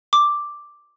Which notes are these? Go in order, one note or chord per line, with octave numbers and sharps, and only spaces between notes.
D6